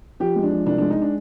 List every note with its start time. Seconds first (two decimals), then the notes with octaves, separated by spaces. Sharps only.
0.20 F3 G4
0.36 G#3
0.43 D4
0.52 F3
0.66 C2 D4
0.78 G#3 D4
0.90 D#4
1.02 D4